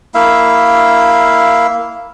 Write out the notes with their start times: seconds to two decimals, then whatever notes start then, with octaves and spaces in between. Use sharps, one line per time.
0.14 A#3 E4 E5 F5